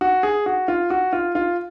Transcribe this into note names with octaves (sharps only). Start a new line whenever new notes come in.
F#4
G#4
F#4
F4
F#4
F4
F4